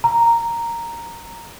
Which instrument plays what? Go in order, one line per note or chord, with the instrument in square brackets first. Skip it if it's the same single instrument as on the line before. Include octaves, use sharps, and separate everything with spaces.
[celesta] A#5